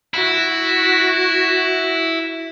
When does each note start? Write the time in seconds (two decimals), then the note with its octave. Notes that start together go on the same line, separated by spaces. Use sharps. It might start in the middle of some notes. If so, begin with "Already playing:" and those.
0.14 E4 F#4